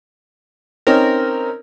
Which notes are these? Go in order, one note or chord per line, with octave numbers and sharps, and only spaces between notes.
C4 C#4 D#4 A#4